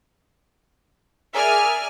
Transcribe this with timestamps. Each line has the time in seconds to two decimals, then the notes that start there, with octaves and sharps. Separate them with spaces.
1.33 G#4 A#4 D5 E5 G#5 F6